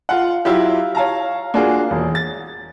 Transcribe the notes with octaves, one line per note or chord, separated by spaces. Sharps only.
F4 F#5
F#3 E4 F4 G4
C#5 F5 A5 A#5
A#3 D4 F4 F#4 G#4
E1
A6